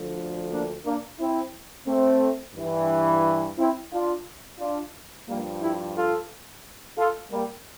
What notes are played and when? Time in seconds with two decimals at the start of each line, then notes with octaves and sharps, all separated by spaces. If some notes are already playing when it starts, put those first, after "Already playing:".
Already playing: D2 D3 F3
0.51 A#3 D4
0.85 A#3 D4
1.19 C4 E4
1.87 A3 C4
2.55 G2 E3
3.57 C4 E4
3.91 D4 F4
4.59 D4 F4
5.27 G2 F3 G3 A#3
5.61 E4 G4
5.95 F4 A4
6.97 F4 A4
7.32 G3 A#3